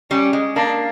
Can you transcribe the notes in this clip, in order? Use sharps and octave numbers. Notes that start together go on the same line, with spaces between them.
G3 C#4
G#3
A#3 D4